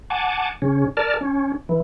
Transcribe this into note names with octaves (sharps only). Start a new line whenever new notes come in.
F#5 G#5 A5 D6
C#3 C#4
A#4 D5 A5 F6
C#4
E3